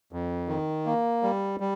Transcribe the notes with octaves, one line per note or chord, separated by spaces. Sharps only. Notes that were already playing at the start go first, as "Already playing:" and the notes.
F2
D#3
A#3
G3
G3